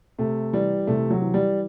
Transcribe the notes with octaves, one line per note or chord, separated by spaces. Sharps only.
C3 A3
E3 G3
C3 A3
F#3
E3
G3